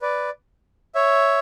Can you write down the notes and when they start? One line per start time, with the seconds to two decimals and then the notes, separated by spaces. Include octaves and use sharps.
0.02 B4 D5
0.95 C#5 E5